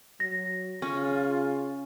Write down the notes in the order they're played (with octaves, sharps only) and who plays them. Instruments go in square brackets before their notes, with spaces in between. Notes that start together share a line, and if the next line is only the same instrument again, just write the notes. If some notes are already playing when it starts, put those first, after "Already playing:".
[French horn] F#3 [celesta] A#6
[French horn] C#3 [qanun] C#4 [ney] F4